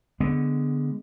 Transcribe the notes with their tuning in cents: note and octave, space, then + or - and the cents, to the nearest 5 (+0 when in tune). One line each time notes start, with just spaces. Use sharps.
D3 +0 G#3 +0 B3 +0